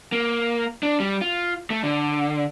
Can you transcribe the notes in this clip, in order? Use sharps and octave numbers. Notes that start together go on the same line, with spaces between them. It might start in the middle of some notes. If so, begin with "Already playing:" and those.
A#3
D4
G3
F4
A3
D3